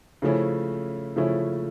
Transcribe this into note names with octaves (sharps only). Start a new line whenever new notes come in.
C#3 F3 A3 C#4 E4
C#3 F3 A3 C#4 E4